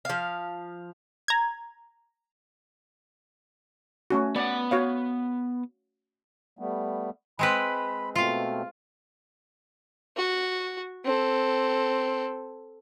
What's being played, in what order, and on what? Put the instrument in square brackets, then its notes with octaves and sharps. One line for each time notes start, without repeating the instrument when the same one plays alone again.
[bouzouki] F3 F5
[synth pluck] A#5 G#6
[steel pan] A3 C#4 F#4
[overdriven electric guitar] B3 F#5 [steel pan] D5
[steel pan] F#4 C#5 F5
[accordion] G3 A3 B3
[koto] G#3 C4 B4 [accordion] B5
[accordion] B2 A3 C4 [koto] F4 F5
[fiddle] F#4
C4 A4